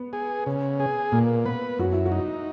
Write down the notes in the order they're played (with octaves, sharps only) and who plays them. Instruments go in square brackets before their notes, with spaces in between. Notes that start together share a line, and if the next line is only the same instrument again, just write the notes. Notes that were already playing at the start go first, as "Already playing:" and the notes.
Already playing: [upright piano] B3
[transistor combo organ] G#4
C#3
G#4
[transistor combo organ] A#2 [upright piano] A#3
[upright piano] B3 [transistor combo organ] B4
[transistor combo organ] F#2 [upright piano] F#4
[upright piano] E4
F#4
[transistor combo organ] D#4